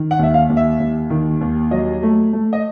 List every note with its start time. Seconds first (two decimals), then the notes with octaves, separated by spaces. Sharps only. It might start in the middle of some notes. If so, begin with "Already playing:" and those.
Already playing: D#3
0.11 F#5
0.19 D#2 E5
0.34 F5
0.49 D#2
0.57 E5
0.80 D#2
1.10 D#3
1.41 D#2
1.71 F#3 D#5
2.03 A3
2.33 A3
2.53 D#5